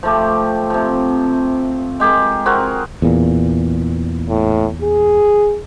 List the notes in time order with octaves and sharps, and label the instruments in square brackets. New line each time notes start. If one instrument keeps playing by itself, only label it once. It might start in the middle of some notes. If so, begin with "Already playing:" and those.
[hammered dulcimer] F3 A3 G4
C3 F3
G#3 G4 G#4 A#4
C4 F#4 G#4 A#4
[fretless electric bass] E2 A#2
[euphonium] A2
G#4